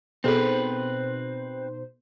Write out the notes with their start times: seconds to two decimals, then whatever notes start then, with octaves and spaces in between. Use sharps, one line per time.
0.24 B2 B3 C4 D#4 G#4 A4 B4 C5